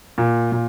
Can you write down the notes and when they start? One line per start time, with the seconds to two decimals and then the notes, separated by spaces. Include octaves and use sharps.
0.18 A#2
0.52 A#2